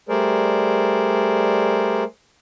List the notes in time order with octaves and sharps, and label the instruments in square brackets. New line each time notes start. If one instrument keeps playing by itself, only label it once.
[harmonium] G3 A3 G#4 A#4 C5 D5